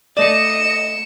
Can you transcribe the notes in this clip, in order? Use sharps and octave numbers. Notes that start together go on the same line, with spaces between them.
A3 D5 D#5 C#7 E7